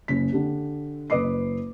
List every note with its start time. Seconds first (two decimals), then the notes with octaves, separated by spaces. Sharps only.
0.08 F#1 C#3 B6
0.32 D3 G4
1.10 F#1 B4 D#5 D6 C7